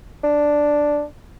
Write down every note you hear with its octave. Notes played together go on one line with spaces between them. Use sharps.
D4